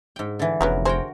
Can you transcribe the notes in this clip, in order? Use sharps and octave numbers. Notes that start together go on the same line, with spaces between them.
G#2 G5
D3 E3
F1 C#3 F#3 B3 A#4
F#4 G#4 A#4 C5 G5